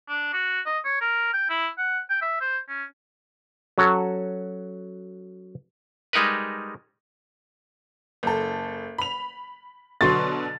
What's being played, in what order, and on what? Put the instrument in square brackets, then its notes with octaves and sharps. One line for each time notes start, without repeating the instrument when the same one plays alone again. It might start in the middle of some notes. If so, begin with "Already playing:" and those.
[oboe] D4
F#4
D#5
C#5
A#4
G5
E4
F#5
G5
E5
C5
C#4
[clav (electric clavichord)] F#3 C#4 F#4 A4
G3 G#3 D#4 A#4 B4
[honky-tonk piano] F#1 A4
B5 F7
[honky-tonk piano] B2 D3 F#3 [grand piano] C6 C#6 A6